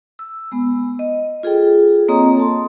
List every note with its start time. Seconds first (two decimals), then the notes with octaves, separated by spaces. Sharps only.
0.19 E6
0.52 G#3 B3
0.99 D#5
1.43 F4 G#4 A4 G5
2.08 A#3 C4 C#5 D#5 A#5 D#6
2.37 A4 A5 C6